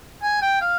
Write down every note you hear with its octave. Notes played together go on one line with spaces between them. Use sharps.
G#5
G5
F5